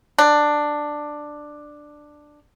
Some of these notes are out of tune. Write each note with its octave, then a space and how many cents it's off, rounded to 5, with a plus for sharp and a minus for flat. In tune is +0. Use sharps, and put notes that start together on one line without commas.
D4 +10